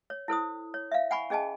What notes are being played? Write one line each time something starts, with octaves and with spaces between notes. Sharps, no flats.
C#5
E4 A4 C5 D#6
C#5
E5 F5
F#5 G#5 B5 C#6
C#4 G#4 D#5 G#5 A5